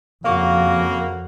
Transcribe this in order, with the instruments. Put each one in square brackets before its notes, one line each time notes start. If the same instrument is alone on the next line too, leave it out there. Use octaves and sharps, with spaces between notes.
[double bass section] F2 [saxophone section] C#3 A#3 [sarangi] F#4 [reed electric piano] F5 C#6